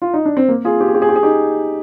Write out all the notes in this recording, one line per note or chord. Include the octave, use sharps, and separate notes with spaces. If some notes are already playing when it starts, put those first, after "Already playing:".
F4
D#4
D4
C4
A#3
F4 G#4
G4
G#4
G4
G#4
G4
G#4
D#4 G4